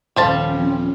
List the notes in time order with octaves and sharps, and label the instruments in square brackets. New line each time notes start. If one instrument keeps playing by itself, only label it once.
[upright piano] D#1 F5 [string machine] F3 C4 C#4 [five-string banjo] G3 C5 A5